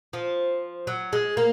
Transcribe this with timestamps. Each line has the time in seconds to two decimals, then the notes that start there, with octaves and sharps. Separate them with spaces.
0.13 F3
0.87 F#3
1.13 G#3
1.37 A#3